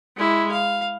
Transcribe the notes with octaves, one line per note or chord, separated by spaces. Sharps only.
G#3 E4
F5